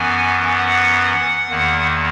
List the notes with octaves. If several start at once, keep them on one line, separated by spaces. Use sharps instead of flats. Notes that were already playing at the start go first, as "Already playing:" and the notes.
Already playing: F#2 E3 B3 G#5
F#5
E2 D#3 A#3